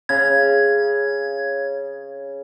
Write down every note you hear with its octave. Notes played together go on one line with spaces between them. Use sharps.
C#3 G#6